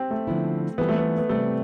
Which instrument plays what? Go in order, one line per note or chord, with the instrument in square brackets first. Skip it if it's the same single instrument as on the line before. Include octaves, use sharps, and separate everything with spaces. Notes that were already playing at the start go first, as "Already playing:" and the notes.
Already playing: [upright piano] C4 G4
A3
[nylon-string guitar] D3 F3 B3 E4
[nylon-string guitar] E3 G3 C4 F4 A4 [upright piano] B3
[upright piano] A3
B3
B3
[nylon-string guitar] C3 G3 C4 [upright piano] A3